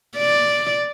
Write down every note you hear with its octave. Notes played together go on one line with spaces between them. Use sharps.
D5